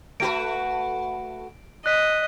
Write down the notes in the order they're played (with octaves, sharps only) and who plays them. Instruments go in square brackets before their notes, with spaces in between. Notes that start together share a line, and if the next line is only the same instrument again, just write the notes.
[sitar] A3 F#4 B4 [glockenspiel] D7
[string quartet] D#5 [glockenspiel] F#6 B6